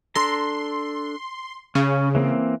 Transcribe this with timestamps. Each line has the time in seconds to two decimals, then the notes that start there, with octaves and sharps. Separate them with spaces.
0.15 D4 A4 A#5 C6
1.75 C#3 C#4
2.15 E3 A#3 C4